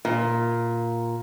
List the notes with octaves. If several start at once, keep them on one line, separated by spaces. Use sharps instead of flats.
A#2